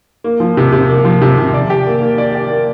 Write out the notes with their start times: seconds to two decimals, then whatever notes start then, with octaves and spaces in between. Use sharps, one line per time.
0.24 A#3
0.40 F3
0.57 C3
0.72 C3
0.90 A#3
1.05 F3
1.22 C3
1.38 C3
1.54 D5
1.70 G4
1.87 A#3
2.02 A#3
2.18 D5
2.35 G4
2.50 A#3